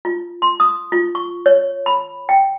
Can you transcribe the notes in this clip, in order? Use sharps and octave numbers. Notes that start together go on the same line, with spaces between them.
F4
C6
D#6
F4
C#6
C#5
B5
G5